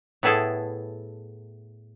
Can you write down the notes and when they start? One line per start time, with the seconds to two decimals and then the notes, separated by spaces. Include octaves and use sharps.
0.23 A2 B3 E4 G#4 A4